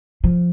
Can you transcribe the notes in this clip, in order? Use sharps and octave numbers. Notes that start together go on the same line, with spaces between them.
F3